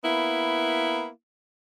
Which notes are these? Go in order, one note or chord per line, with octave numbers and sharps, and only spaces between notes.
A#3 B3 E4